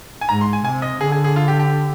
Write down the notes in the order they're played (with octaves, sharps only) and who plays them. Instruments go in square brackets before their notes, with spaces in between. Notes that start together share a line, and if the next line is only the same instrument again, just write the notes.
[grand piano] G#5
[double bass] G#2 [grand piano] A#5
[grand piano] C6
G#5
[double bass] C3 [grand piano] G#5
[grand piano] D#5
[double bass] D3 [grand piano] G#4
[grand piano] G#4
G#4
F4
G4
G4